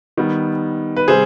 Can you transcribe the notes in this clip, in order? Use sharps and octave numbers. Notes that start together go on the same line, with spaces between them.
D#3 G3 B3
B4
C3 G3 G#4 C5